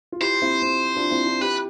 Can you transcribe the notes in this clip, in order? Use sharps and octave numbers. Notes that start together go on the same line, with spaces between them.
F4
E4 G4 C5
C4 E4
C4
D4 F4
C4 E4
D4 F4
E4 G4 B4